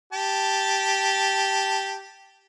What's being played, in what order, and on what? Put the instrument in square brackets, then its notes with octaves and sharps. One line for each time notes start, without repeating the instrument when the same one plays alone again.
[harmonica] G4 A5